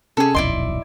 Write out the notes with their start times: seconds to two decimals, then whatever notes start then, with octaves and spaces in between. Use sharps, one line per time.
0.17 C3 C#4 G#4 A4
0.35 D#1 B1 F2 E4 D5 D#5 C6